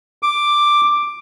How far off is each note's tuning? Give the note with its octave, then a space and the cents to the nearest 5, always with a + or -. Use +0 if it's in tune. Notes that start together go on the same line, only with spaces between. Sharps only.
D6 +5